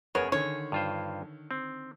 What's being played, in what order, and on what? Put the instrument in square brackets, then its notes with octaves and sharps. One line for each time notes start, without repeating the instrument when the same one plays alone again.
[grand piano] F#1 [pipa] B3 A#4 C#5 [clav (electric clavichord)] G#4
[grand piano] D3 D#3 [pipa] C#5
[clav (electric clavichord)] G2 F4 C5
C4